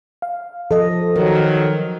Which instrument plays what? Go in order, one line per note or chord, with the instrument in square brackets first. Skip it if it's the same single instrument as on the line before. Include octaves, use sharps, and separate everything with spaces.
[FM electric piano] F5
[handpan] F3 D#5 [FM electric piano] A4
[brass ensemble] D#3 F#3 [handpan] A#4